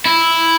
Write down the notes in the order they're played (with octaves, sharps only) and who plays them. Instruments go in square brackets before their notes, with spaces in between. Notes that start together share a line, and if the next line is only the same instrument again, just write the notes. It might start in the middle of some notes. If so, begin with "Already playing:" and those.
[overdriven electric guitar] E4